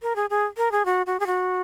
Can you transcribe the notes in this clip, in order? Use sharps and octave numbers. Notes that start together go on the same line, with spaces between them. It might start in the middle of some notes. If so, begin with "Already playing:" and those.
A#4
G#4
G#4
A#4
G#4
F#4
F#4
G#4
F#4